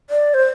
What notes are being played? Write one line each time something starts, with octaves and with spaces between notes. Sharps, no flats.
D5
C5